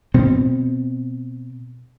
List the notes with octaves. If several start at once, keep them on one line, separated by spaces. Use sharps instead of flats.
B2 C4